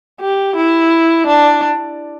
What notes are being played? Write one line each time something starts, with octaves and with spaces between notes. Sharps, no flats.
G4
E4
D4